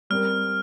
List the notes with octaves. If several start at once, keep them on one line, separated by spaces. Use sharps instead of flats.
G3 C4 A#4 F6